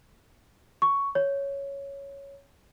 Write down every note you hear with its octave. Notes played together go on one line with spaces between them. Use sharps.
C#6
C#5